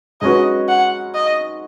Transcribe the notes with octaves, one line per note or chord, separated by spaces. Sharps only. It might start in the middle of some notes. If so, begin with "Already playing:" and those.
G#2 G#3 C#4 F#4 B4 D#5
F#5
D#5